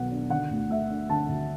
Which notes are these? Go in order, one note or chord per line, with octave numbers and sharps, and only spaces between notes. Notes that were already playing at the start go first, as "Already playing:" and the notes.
Already playing: B1 B2 B3 F#5
D4
D3 F#5
D2
A3 E5
D4
D3 A5
D2